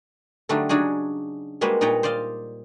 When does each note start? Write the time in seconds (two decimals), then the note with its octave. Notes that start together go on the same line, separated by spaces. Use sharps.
0.49 D3 F#3 G3 A3 D4 D#4
0.69 C#3 F#3 D4 D#4 F#4 G#4
1.61 G3 G#3 A#3 F#4 B4 C5
1.81 A#2 D#4 B4 C#5 G5 A#5
2.03 C5 D5 D#5 F5